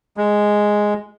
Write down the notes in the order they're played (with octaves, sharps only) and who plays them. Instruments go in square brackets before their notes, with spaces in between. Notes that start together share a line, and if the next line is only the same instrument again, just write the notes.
[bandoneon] G#3